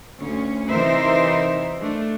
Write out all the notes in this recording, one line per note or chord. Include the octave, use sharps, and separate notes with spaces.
D2 C#4
C3 E3 D#4 A#4 C5 E5
A3 D4